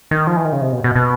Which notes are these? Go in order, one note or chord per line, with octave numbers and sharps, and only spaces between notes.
D#3
F3
E3
D#3
C#3
C3
B2
B2
B2